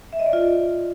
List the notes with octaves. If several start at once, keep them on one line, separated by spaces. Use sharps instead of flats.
E5
D#5
D5
F4